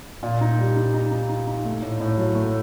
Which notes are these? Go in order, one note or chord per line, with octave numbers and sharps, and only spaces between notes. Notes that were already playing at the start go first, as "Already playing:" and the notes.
A#2
D#4
G3
D#4
D#4
D#4
D#4
D#4
A3
A2
A2
F#3
A3